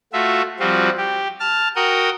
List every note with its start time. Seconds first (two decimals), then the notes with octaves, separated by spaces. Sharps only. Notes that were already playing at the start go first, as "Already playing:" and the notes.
0.13 A3 F4 F#4 E5
0.60 F3 G3 C4 F4 F#4
0.98 G4
1.40 A5 F6
1.76 F#4 A#4 F#5 G5 D#6